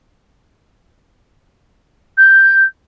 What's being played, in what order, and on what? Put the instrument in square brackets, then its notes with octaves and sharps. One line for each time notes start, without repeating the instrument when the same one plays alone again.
[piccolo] G6